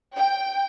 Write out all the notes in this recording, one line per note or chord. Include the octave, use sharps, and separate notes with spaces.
G5